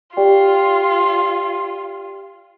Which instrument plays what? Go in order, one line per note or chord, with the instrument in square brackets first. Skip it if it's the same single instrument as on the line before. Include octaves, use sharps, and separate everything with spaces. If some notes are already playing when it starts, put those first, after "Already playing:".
[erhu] F4 [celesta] G4 D5 G5